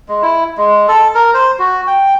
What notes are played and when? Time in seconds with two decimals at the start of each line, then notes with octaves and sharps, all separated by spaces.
0.09 G#3
0.22 E4
0.58 G#3
0.88 A4
1.15 A#4
1.34 C5
1.59 F#4
1.87 G5